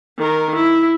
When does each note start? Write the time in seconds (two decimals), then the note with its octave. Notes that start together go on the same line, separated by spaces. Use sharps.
0.18 D#3 A#4
0.55 E4